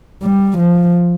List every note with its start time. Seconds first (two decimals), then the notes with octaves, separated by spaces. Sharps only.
0.23 G3
0.58 F3